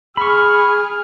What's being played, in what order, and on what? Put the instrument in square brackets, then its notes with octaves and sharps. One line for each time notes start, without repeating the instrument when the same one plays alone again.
[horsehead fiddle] G#4 [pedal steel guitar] B5 C#6 [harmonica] F6